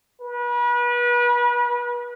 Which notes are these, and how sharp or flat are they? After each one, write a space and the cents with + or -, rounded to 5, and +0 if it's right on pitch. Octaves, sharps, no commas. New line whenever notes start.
B4 -35